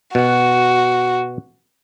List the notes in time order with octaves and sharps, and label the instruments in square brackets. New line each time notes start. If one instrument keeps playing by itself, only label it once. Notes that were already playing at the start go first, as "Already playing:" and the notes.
[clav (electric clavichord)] B2 F#5 [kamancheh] F#4